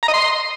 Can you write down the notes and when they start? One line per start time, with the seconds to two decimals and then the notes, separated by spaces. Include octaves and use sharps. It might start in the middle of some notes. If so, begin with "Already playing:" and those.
0.03 A#5
0.08 D#5
0.14 C6